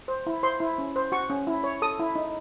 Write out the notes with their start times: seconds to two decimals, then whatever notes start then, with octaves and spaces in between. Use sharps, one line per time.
0.08 C5
0.27 E4
0.43 C5 C6
0.60 E4
0.78 C#4
0.96 C5
1.12 F#4 C#6
1.30 C#4
1.47 E4
1.64 C#5
1.82 A4 D#6
1.99 E4
2.16 D#4